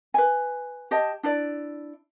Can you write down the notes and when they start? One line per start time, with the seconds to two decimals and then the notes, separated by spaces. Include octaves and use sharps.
0.14 B4 G#5
0.91 G4 D#5 A5
1.23 D4 E4 D5